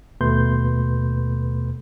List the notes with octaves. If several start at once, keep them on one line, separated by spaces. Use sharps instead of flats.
D#2 B2 A3 B4 C6 G6